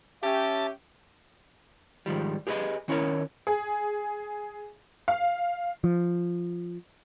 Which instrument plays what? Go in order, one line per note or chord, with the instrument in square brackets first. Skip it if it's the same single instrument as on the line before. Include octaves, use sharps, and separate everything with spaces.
[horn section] C#4 G4 [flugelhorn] E5 [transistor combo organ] A5
[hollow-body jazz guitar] G#2 D#3 F3 G3
G4 G#4 B4 C#5 D#5 G#5
D#3 C#4 E4 A#4 C#5
[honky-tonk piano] G#4
F5
[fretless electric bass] F3